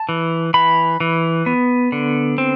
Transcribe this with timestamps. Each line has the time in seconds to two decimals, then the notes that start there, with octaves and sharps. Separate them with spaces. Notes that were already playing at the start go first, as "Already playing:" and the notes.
Already playing: A5
0.09 E3
0.54 E3 B5
1.00 E3
1.46 B3
1.92 D3
2.38 C4